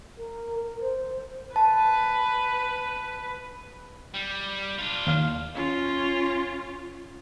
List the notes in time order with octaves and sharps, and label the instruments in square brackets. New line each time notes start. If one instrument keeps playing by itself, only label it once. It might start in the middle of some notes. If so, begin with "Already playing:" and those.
[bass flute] A#4
A#4
C5
[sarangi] B4 [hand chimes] A5
[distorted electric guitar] G3
D4 F4
[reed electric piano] D#2 F5 F6
[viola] C#4 F4